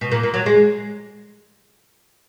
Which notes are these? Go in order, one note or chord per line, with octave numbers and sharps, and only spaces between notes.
B2
A#2
A#2
F#3
G#3